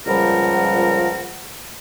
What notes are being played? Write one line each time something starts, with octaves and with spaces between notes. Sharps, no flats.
C#2 A#2 F3 G3 A#4 F#5